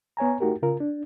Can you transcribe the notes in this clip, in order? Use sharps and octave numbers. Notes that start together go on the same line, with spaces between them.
B3 C#5 G#5 A#5
A3 D#4 F#4 G4 A#4
C#3 F4 A#4
D4